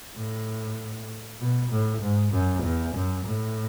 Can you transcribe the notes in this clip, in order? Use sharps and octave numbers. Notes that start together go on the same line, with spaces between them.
A2
B2
A2
G#2
F#2
E2
F#2
A2